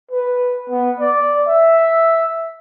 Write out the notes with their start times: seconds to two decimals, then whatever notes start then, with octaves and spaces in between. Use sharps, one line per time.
0.11 B4
0.70 B3
1.00 D5
1.47 E5